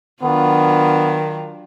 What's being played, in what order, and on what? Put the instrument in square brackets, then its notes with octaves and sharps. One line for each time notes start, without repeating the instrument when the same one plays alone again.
[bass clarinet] D#3 [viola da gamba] F#3 D4 F4 [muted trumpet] B3